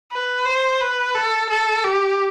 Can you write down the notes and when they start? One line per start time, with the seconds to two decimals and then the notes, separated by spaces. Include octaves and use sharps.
0.12 B4
0.45 C5
0.81 B4
1.15 A4
1.50 A4
1.84 G4